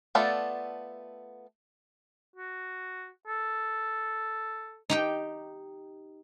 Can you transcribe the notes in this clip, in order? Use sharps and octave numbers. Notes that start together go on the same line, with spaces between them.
A3 B3 F4 A4 D5
F#4
A4
D#4 G4 G5